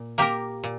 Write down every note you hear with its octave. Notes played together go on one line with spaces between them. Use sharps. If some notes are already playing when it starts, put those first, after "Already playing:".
Already playing: A#2
A#3 G4 A#4
A#2